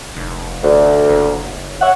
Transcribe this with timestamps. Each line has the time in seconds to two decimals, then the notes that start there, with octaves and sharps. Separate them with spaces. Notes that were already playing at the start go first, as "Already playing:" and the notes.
0.17 F1
0.63 D2
1.09 F#1
1.81 C#5 E5 F#5